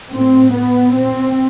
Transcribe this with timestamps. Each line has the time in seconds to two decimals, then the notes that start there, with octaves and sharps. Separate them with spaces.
0.12 A2 C4
0.53 B3
0.95 A#2 C4